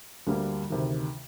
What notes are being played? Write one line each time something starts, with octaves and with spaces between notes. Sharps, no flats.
D2 D3 G3 A#3
D2 C3 D#3